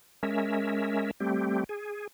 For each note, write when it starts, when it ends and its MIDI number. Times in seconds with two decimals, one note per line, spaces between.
0.23 1.11 56
0.23 1.11 61
0.23 1.11 70
0.23 1.11 76
1.20 1.64 55
1.20 1.64 57
1.20 1.64 60
1.20 1.64 67
1.69 2.07 68